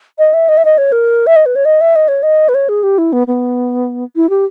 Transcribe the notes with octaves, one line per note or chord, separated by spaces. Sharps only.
D#5
E5
D#5
E5
D#5
C#5
A#4
E5
D#5
B4
C#5
D#5
E5
D#5
C#5
D#5
B4
C#5
G#4
G4
E4
B3
B3
E4
G4